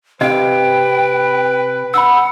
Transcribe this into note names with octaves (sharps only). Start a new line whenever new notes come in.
C3 B4 D#5 F5 G5
F#5 B5 E6